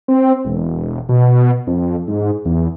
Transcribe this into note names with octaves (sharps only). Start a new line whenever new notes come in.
C4
E1
B2
F2
G#2
E2